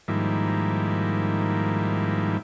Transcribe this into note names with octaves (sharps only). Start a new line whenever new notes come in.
G#2 D#3 F3 G3 A#3 E4